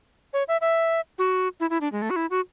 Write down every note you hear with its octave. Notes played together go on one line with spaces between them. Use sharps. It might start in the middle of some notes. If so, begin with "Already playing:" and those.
C#5
E5
E5
F#4
E4
E4
D4
G#3
A3
F#4
E4
F#4